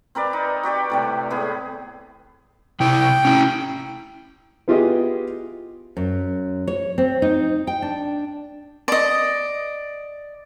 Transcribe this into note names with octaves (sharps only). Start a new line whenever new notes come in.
C4 A#4 B4 D5
D#4
F#4 G4 D5 G5
A2 C3 G3
A2 B3 G#4
C3 E4 G5
C#4 E4
B3 E4 F4 G4 G#4 D#5
F#2
C#5
C4
D#4
G5
D4
D5 D#5